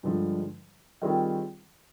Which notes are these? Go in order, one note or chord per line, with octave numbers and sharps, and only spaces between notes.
G2 D3 F3 G#3
D#3 G3 C4 F4 G#4